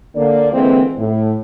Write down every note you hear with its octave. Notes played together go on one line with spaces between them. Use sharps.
D3 A#3 D5
D3 E3 G#3 A#3 C4
A2